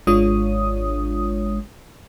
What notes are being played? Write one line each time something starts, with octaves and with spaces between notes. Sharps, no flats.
G#1 G#3 D4 F4 C#5 D#6